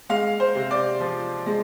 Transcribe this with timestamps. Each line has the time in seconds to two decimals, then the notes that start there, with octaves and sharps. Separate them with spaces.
0.09 G#3 F5
0.40 C5
0.55 C3
0.71 D5
1.00 F3
1.46 G#3